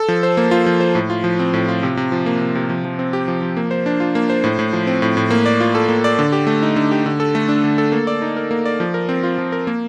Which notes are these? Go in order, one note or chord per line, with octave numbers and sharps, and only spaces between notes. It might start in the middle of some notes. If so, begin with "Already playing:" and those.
Already playing: A4
F3
C5
A#3
F4
F3
C5
A2
F4
F3
C4
A2
F4
C3
C3
F3
A#3
C3
C3
F3
F3
C4
G4
F3
F3
A#3
C5
D4
F4
A#3
C5
A2
A2
F3
C4
A2
A2
A#3
D5
F4
A4
A#3
D5
D3
G4
A3
D#4
D3
G4
D3
A4
A3
D4
D3
A4
A#3
D5
D#4
A#4
A#3
D5
F3
A#4
C4
F4
F3
A#4
A#3